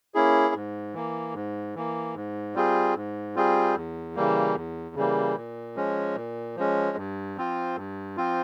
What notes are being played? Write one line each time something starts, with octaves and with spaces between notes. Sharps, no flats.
A#3 C#4 E4 G#4
G#2
E3 A#3
G#2
E3 A#3
G#2
G3 C4 F4 G#4
G#2
G3 C4 F4 G#4
E2
C#3 E3 G3 A#3
E2
C#3 E3 G3 A#3
A#2
F3 G#3 C#4
A#2
F3 G#3 C#4
G2
F3 C4 F4
G2
F3 C4 F4